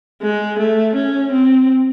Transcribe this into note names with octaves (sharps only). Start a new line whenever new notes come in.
G#3
A3
C#4
C4